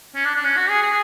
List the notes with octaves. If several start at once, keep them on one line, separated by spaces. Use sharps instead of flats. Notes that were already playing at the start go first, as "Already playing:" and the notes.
C#4
D4
D4
C#4
F#4
G#4
G#4